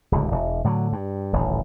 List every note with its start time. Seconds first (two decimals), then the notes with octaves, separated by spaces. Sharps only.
0.12 D1 C#2 D3
0.31 E1
0.64 A2 D3 F3 F#3
0.93 G2
1.33 D#1 A1 D2